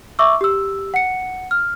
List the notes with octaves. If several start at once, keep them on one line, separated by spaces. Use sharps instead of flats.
E5 C#6 D6 E6
G4 E6
F#5 C#7
F6